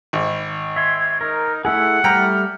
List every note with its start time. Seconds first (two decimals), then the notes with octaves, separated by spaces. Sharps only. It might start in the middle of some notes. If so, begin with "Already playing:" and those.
0.13 G#1
0.76 E5 C6 G#6
1.21 D#4 A#4 F6
1.65 A3 E4 G#4 F#5 E6
2.04 G3 A3 G5 A#5 F6